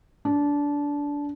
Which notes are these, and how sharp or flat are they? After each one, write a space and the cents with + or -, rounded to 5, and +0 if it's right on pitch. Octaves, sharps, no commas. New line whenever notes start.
D4 -20